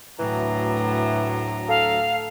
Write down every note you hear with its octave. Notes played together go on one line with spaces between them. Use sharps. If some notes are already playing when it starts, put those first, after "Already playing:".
D2 A2 E3 F#3 A#5
A4 F5